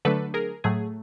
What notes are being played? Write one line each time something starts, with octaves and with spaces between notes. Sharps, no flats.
D3 F#3 A3 D4 A4 B4
G#4 A#4
A2 F#3 A3 G#4